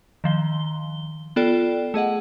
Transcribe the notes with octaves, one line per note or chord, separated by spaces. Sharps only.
D#3 F3 G7
B3 F4 A4 D5 G5
A3 G#4 D#5 F#5